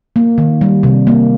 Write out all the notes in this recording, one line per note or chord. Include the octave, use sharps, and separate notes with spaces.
A#3
D#3
G3
C3
A#3